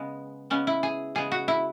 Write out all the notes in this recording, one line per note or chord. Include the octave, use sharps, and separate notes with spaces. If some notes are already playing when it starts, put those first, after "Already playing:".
Already playing: C#3 G#3 B3
C#3 G#3 B3 C#4
E4
G#4
C#3 G#3 B3 G#4
F#4
E4